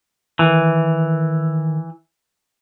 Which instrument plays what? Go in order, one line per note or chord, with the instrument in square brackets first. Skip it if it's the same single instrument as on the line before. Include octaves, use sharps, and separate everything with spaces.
[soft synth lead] D#3 [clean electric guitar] E3